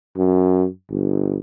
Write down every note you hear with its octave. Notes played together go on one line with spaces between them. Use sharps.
F#2
G1